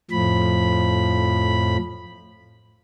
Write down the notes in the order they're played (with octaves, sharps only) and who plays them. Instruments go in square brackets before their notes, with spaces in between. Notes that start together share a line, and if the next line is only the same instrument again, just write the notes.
[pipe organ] F2 A2 F3 B5